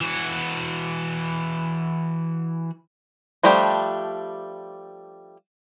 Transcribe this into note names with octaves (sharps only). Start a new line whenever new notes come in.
E3 F#4
F3 G3 A3 D4 G4